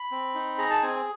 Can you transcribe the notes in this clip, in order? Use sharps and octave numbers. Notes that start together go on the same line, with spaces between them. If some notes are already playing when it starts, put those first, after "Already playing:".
Already playing: B5
C4
D#4
G#4 A#5
A5
C4 G#5